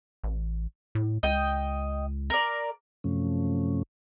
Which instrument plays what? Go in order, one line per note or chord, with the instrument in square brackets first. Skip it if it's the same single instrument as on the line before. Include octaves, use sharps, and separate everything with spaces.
[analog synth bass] A1
A2
[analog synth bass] C#2 [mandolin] D#5 G5
[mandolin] A#4 D5
[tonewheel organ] F#2 C3 F3 A3 C#4